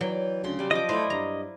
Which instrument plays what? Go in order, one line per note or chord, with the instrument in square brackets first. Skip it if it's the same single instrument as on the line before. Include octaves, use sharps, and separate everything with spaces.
[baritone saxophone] E3 [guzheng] F#3 [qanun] D5 G5
[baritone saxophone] D2 [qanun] C#3 C6
[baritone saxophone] C3 [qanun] G3 D5
[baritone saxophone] C#3 [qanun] F3 D6 [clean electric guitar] D#5
[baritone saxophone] A3 [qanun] E4 D5 F5 [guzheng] C5
[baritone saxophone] G2 [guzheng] A#5